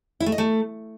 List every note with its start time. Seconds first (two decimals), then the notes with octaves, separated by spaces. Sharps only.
0.20 E4
0.26 A3
0.32 D#5
0.38 A3